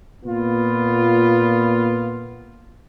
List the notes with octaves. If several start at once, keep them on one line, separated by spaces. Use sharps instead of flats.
A#2 B3 F4